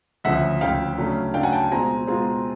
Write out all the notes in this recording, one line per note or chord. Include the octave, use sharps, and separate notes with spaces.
D2 C#3 F3 E5 F#5
D2 C#3 F3 F5 G5
C#3 F#3 A3 D4
C#3 F#3 A3 D4 F5 G5
F#5 G#5
G5 A5
B2 G#3 C4 F4 G#5 A#5
B2 G#3 C4 F4